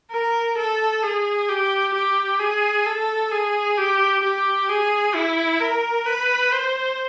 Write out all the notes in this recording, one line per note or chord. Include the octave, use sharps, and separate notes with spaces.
A#4
A4
G#4
G4
G4
G#4
A4
G#4
G4
G4
G#4
E4
A#4
B4
C5